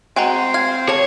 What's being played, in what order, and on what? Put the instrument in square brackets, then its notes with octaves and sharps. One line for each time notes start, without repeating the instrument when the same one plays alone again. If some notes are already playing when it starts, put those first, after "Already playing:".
[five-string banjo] G#3 F#4 G#5 [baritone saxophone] C4 [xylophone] G5 A#5
[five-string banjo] F5 [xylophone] F6 G#6
[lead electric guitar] C#5 [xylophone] A5 F7